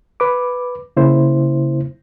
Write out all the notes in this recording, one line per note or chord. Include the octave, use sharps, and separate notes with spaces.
B4 D6
C#3 A#3 E4 C5